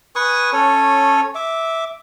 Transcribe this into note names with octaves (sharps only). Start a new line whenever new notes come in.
B4 G#5 C#6 D#6
C#4 A4 C#5
E5 D6